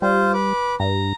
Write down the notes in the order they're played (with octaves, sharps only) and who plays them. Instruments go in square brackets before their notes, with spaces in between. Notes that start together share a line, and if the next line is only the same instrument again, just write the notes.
[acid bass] G3 [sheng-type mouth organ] F4 C5
[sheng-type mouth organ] B4 D6
[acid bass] G2 [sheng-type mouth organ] A#5